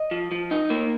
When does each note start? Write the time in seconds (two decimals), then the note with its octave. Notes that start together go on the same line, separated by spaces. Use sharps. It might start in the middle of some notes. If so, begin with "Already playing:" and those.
Already playing: D#5
0.11 F3
0.31 F3
0.51 D#4
0.70 A#3